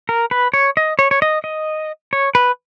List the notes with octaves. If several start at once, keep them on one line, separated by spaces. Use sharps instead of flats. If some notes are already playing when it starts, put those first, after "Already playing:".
A#4
B4
C#5
D#5
C#5
C#5
D#5
D#5
C#5
B4